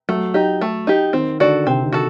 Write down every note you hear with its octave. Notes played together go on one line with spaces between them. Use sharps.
F#3 A3
D#4 G4
A3
D#4 G4
D#3 C4
D3 F#4 A4 D5
C3 C4
D#3
F#4 A4